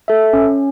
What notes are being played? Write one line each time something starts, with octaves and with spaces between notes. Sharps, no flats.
A4 E5
C#4